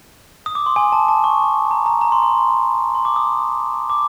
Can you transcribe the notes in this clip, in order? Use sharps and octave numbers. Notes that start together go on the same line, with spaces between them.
D#6
D6
C6
G#5
A5
A5
C#6
A#5
A#5
A#5
C6
C6
C6
D6
D#6
D6